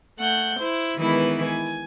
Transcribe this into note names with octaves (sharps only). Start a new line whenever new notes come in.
A3 F#5 G6
E4 C5
D#3 E3 G#3 B3 E4 B4
G#5